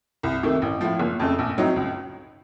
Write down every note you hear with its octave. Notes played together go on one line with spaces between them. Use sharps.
C2
C3 D#3 A3
A1
A2 F3
F#1
F2 C#3 A3
A#1
A2 F#3 C4 D#4
C#2